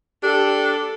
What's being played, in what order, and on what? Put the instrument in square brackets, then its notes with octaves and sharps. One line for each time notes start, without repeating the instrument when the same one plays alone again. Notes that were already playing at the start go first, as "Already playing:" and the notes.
[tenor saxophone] D4 [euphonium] G4 [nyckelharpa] A4